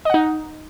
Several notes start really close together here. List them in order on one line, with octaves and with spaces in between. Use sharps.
D#5 F#5 D#4